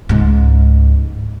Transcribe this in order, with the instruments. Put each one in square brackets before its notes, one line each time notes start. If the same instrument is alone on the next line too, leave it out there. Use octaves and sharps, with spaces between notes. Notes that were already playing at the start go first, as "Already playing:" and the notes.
[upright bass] C#2 G#2